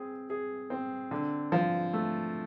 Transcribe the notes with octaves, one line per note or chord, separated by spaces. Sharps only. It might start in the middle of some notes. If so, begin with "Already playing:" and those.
Already playing: C4 G#4
G#4
C4
D3
F3
A3